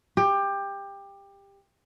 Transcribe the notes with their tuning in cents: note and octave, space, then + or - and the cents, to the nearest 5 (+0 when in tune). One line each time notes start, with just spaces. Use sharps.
G4 +20